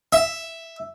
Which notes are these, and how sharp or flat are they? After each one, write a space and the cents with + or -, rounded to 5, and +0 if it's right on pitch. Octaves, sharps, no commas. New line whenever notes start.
E5 +0